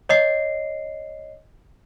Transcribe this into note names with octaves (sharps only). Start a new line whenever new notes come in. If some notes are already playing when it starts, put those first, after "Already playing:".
C#5 D#5 C7